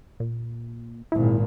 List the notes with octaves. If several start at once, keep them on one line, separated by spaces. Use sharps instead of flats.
A#2
G#1 A#2 E4